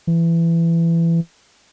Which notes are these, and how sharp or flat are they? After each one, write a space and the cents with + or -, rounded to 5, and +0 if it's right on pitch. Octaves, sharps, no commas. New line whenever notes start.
E3 +20